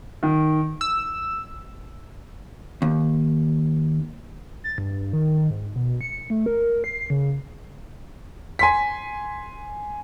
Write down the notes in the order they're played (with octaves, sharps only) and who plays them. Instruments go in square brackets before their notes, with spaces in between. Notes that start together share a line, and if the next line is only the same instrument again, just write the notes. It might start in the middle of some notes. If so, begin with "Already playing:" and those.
[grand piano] D#3
[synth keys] E6
[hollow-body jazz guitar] D#2
[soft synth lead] A6
G2
D#3
G#2
B2
C#7
A3
A#4
C7
C#3
[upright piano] G#5 C6 B6